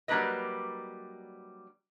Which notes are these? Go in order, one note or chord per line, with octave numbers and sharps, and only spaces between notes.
F#3 G3 A#3 D4 B4 D#5